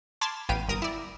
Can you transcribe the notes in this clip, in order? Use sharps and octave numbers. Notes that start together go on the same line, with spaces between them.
A5 B5 C6 D6 F6 G#6
A1 B3 F5 G5 D#7
G1 A#4 D#6
E4 D5